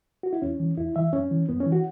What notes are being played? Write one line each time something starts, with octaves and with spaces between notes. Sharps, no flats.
F#4
E4
E2 C#4
E3
E2 E4
E3 E5
F#2 C#4
E3
F#2 B3
C#4
E3
F#4